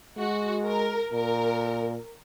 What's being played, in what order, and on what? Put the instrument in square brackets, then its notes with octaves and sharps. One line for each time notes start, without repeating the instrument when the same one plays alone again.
[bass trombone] G#3 [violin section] F#4
[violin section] A#4
[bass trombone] A#2 [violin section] A#4